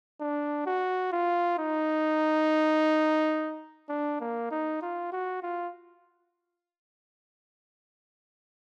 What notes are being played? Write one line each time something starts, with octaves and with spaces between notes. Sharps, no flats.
D4
F#4
F4
D#4
D4
A#3
D#4
F4
F#4
F4